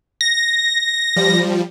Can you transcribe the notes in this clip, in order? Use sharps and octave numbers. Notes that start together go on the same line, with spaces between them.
A#6
F3 G3